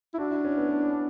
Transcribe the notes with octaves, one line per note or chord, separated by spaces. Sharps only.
E4
D4 F#4
E4
C#4
B3
B3
C#4